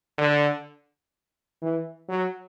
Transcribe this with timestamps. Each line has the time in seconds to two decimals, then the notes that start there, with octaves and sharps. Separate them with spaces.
0.18 D3
1.62 E3
2.09 F#3